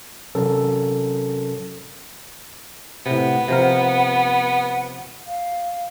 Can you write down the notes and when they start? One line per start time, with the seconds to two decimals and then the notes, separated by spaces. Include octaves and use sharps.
0.35 C3 F#3 C#4 A4 A#4
3.06 A2 C3 B3 F#5
3.48 C3 F3 A#4
5.27 F5